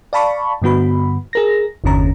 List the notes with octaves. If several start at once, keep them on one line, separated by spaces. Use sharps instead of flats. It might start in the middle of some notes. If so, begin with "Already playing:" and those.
D5 F5 A5 B5 C#6
G2 D3 B3 F#4 B5
G#4 A#4 A#6
G1 E2 D3 C#4 A#5